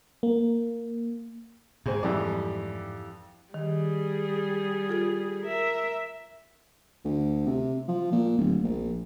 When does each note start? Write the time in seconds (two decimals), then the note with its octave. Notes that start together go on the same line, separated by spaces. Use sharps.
0.23 A#3
1.86 G#2 C4 G#4
2.03 F2 E3 G3 E4 G4 D5
3.54 D#3 G3 G#4
4.89 F4 A4 G#6
5.46 A#4 E5
7.05 D2
7.47 C3
7.88 F3
8.12 A#2
8.38 D1
8.64 A#1